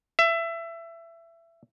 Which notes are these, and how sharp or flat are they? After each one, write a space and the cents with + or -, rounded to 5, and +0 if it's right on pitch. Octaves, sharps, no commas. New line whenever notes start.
E5 +20